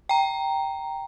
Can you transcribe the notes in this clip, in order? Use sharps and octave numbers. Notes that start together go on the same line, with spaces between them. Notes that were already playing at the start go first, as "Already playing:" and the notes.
G5 A#5